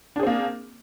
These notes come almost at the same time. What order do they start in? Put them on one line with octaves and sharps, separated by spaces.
D4 G#4 C4 A#3